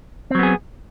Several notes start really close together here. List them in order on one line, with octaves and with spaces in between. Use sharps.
C4 F#3 B3 G#4